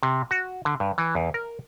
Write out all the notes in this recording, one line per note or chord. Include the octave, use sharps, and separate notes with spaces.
C3
F#4
D3
G2
E3
E2
A#4